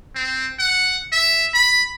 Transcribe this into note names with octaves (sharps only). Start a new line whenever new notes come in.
C4
F#5
E5
B5